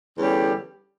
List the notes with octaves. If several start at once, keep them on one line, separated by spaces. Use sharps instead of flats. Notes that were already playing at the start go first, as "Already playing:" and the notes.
E2 D3 G3 C#4 G4